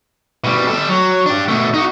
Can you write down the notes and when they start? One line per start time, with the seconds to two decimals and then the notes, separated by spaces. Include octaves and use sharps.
0.44 B2 G3
0.67 G3 A4
0.89 F#3
1.26 D4 G4
1.48 B2 A3
1.74 D#4 F#4